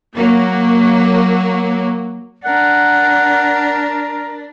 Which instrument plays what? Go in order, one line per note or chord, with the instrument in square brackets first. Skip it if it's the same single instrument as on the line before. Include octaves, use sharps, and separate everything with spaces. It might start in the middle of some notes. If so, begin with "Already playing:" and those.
[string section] F#3 A#3
[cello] D4 [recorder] A#4 [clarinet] F#5